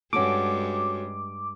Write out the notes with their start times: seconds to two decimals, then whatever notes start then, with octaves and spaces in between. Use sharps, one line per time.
0.13 G2 G#3 C#4 F#4 A4 D6